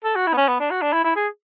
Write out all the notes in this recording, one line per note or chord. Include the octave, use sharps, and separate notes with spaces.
A4
F#4
E4
B3
C#4
B3
D4
F#4
D4
E4
E4
G#4